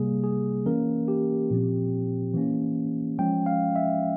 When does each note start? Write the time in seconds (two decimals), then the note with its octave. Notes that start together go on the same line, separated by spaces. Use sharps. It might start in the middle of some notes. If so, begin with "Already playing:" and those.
Already playing: C3 G3 A#3 G#4
0.24 G#4
0.66 E3 A#3 C#4 A#4
1.08 G4
1.50 A#2 F3 C4
2.34 E3 A#3 C#4
3.18 F3 G#3 C#4 G5
3.46 F5
3.76 E5